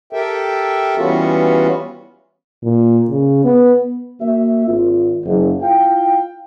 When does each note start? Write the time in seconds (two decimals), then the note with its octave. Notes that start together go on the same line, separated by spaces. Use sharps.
0.13 G4 A4 A#4 E5 G5
0.97 E3 G3 B3 C#4 F4 F#4
2.63 A#2
3.09 C#3
3.44 B3
4.20 A#3 F#4 E5
4.67 G#1 C4 F4
5.25 F#1
5.61 E4 F4 F5 G5